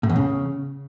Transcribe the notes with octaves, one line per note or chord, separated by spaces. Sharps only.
A2
E2
C#3